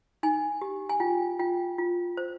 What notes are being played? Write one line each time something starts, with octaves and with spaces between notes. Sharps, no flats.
D#4 G#5
G4
G#5
F4 G5
F4 G5
F4
C5